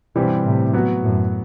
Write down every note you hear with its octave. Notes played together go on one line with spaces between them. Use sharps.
G2 B2 E3 G3 C4 G4
A2 C3
F#3 B3 F#4
F#2 A2